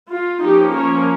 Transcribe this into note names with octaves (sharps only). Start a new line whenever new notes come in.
F4
F3 A#3 C#4 D#4 G4
A#4 C#5